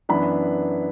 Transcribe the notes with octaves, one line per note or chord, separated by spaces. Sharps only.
F#2 E3 B3 D4 B5